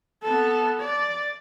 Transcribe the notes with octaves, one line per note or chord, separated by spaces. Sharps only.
B3 A4
D5